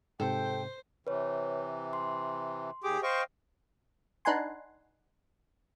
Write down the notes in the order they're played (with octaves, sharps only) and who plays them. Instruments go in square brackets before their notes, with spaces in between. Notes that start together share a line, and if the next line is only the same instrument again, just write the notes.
[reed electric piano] G#2 C3 [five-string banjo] A4 [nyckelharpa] C5 [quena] G5
[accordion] C3 E3 [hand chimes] B4 C#5
[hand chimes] C6
[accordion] D#2 D6 [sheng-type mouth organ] G4 G#4
[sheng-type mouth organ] C5 C#6 [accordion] D#5 F5 G5
[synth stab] D4 D#4 B4 F#5 G#5 C6